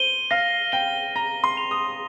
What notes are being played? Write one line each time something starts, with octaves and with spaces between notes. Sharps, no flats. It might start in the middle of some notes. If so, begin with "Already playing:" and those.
Already playing: C5 D#7 G7
F5 A#6
G5 G7
A#5 A#6
C6
F7
D#6